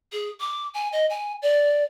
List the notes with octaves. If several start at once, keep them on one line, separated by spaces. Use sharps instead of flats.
G#4
D6
G#5
D#5
G#5
D5